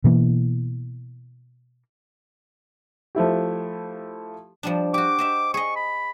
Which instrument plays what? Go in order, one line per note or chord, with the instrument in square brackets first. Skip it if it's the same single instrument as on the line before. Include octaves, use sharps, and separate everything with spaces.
[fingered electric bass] B2 E3 A#3
[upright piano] F3 A3 E4 G4
[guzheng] F3 G3 D4
[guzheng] F#4 G4 [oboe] D6
[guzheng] C5 D#5 E5
[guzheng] G#4 D#5 [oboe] C#6
[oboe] B5